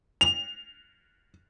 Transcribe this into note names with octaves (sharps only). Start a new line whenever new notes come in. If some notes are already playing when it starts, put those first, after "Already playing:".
F7